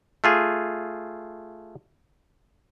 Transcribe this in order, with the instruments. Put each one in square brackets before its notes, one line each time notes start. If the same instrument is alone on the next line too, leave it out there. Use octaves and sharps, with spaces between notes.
[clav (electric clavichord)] A3 F4 G#4